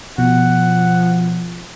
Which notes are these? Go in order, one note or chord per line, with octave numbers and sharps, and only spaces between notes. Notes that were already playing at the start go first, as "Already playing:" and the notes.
B2 F3 F#5